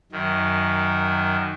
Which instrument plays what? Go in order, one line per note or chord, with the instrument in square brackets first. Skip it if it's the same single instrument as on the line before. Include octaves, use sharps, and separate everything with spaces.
[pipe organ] F#2 D#3